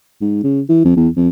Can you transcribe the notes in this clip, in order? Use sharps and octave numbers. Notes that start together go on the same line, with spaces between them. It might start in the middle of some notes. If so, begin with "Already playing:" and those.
G#2
C#3
E3
F2
E2
F2